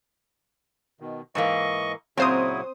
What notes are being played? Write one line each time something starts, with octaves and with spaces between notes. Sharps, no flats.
B2 D#3
G#2 E3 A#3 D#5 C#6
A#2 C#3 F#3 C4 E4 C5 A#5 D#6